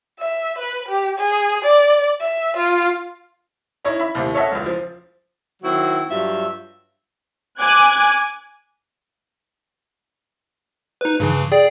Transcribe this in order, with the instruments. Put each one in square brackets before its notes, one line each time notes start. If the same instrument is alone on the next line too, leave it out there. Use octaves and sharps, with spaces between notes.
[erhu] E5
B4
G4
G#4
D5
E5
F4
[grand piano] C#4 D#4 E4 C#5
E5 B5
D#2 A2 C3
C#4 A4 C#5 D#5 E5 F#5
E1 C#2
F3
[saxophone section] D#3 F#3 C4 E4 F#4
G2 F#3 F4 E5
[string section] G#5 D6 F#6 G#6
[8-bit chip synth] D#4 B4
G2 C#3 E3
G#4 D5 G5